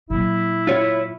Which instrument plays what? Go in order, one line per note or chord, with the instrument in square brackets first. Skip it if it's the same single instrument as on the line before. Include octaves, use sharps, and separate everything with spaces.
[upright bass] A#2 F#3 [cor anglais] E4
[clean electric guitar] F4 C#5